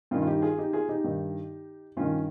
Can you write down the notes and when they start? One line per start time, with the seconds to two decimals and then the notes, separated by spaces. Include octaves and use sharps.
0.11 G2 D#3 C#4 F4
0.22 F4
0.27 D#4 G4
0.42 F4 G#4
0.58 D#4 G4
0.73 F4 G#4
0.89 D#4 G4
1.04 G2 D#3
1.97 G2 D#3 C#4 F4